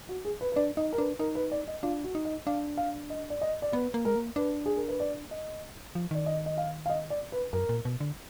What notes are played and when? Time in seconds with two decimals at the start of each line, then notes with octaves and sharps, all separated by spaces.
0.09 F#4
0.25 G#4
0.41 B4
0.52 B4
0.56 D4 D5
0.77 D#4 D#5
0.93 A#4
0.98 D4 B4
1.19 D#4 A#4
1.35 B4
1.52 D5
1.68 D#5
1.83 D4 F4
2.04 F#4
2.15 D#4
2.25 D#5
2.47 D4 F5
2.77 F5
3.10 D#5
3.30 D5
3.41 D#5
3.62 D5
3.73 B3 B4
3.94 A#3
4.05 G#3 A#4
4.16 A#3
4.36 D4 B4
4.66 G#4
4.77 A#4
4.88 B4
5.00 D5
5.31 D#5
5.95 F3
6.11 D#3 D5
6.26 D#5
6.46 D#5
6.58 F5
6.86 F5
6.90 D#5
7.10 D5
7.32 B4
7.53 F#2 A#4
7.69 A#2
7.85 B2
8.00 D3